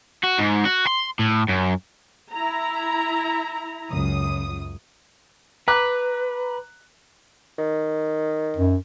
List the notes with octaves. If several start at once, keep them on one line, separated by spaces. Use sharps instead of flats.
F#4
G#2
F#4
C6
A2
F#2
E4 A#5
C#2 F#2 D#6
B4 A#5 D6 F#6
D#3
F#2